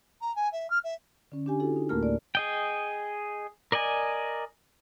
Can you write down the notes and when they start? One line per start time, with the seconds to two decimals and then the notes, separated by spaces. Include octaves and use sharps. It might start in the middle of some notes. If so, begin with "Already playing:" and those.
0.22 A#5
0.36 G#5
0.52 E5
0.70 F6
0.84 E5
1.32 D3 C#4
1.46 D4 G4 G#5
1.60 E4 F#4 A4
1.76 D#4
1.89 D2 A2 A3 A#3 A#4 F6
2.03 D5
2.35 G#4 D#5 G5
3.72 A#4 D5 D#5 G#5